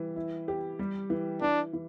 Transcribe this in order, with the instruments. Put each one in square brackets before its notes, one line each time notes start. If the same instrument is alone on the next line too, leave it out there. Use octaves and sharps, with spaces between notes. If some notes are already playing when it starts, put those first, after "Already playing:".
Already playing: [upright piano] E3 G3
E4
G4
G3
E3
[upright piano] E3 [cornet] D4
[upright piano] E3